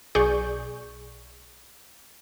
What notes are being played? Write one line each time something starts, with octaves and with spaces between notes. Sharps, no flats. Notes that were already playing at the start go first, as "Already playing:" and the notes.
B1 G#4 D5 C#6 G6